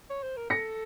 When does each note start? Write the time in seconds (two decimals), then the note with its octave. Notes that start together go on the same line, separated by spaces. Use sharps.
0.10 C#5
0.23 C5
0.36 A#4
0.50 A4 A#6 C#7